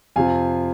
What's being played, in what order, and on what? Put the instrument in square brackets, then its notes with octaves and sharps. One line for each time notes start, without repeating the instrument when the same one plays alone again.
[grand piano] F2 C3 F3 F5 G#5